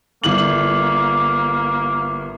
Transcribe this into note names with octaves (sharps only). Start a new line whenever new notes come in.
G1 A#3 E4 F#7